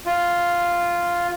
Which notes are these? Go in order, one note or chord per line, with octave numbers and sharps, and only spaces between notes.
F4